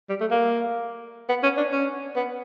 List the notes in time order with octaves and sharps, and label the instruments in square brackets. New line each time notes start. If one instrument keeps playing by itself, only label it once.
[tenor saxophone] G3
A3
A#3
B3
C#4
D4
C#4
B3